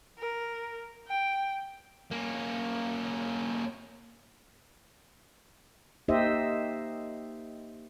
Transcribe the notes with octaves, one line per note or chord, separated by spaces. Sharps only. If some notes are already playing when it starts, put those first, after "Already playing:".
A#4
G5
A#3 C#4
A#3 D#4 G4 C5 D#5 E5